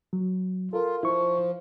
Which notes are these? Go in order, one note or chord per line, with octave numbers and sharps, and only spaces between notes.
F#3
F4 A4 A#4
F3 E4 C#6